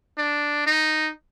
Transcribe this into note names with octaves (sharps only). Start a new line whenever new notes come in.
D4
D#4